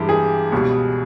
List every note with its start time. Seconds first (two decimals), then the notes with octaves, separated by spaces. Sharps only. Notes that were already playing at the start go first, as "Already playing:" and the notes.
Already playing: G2 E3 G#3 G4
0.09 G#4
0.52 C#2 B2 G3